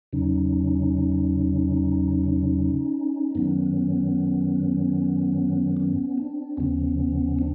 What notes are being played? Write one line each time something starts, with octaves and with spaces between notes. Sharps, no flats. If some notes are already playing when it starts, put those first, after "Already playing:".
E2 C#3 F#3 C#4 D#4
F#2 D#3 F#3 B3 C#4
B3 C#4
C4 D4
D#2 C#3 F3 B3 C#4
C4 D4